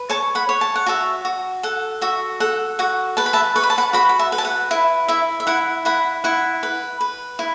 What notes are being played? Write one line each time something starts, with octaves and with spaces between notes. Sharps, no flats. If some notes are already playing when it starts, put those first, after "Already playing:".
Already playing: B4
C#5 A5 C#6
F#5 B5
C#5
A5
F#5
F#4 E5 A5
F#4
A4 F#5
F#4 E5
A4 F#5
F#4 F#5
B4 A5
B5
E5 A5
B4 C#6
B5
A5
F#5 B5
F#4 F#5 B5
B5
E5 A5
B4
A5
F#5
E4 E5
E4 E5
E5
E4 F#5
E4 F#5 B5
E4 F#5
B4
B4
E4